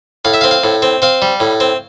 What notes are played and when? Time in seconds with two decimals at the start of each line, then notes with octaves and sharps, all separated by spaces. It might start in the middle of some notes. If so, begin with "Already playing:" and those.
0.25 A2 F5
0.34 E5
0.41 F5
0.44 C4
0.51 F5
0.64 A2
0.82 C4
1.02 C4 F5
1.22 G3
1.40 A2
1.60 C4